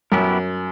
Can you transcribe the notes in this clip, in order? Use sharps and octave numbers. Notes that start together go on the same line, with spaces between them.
F#2 F#3 B3 E4 G4 A#4